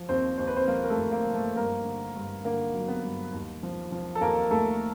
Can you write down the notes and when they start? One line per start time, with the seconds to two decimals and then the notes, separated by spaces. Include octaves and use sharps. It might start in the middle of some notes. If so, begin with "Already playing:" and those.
Already playing: F3
0.09 D#2 C4 C5
0.37 D#2 C5
0.47 B4
0.56 C4 C5
0.67 F3 A#3 A#4
0.83 A#4
0.90 A3 A4
0.97 D#2
1.12 A#3 A#4
1.26 F3
1.33 A3 A4
1.56 G2 A#3 A#4
1.85 D3
2.15 G2
2.45 D3 A#3 A#4
2.73 F#3
2.88 B3 B4
3.04 G2
3.33 D#2
3.63 F3
3.92 F3
4.15 A4
4.21 D#2 A#3 A#4
4.51 D#2 A3 A4